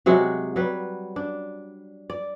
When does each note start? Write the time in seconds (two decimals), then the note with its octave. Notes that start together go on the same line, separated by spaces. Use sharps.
0.06 C3 F#3 G#3 F#4
0.56 F#3 G3 B4
1.16 D4
2.10 D5